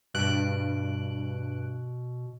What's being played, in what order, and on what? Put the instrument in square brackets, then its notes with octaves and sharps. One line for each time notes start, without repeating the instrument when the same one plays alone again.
[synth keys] G2 F#6 D7 [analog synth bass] B2